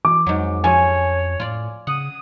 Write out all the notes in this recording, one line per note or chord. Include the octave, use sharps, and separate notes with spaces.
E3 D6
F2 G#2 F#3
F3 C#4 A4 C#5 G#5
A2 F4 D5
C#3 F#5 D#6